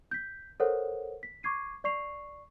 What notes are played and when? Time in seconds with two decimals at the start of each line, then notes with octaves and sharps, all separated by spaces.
0.11 G6 B6
0.60 A4 A#4 C5 C#5 F#5
1.23 B6
1.43 C#6 D6 G#6 C7 D#7
1.84 D5 C#6 C7 F7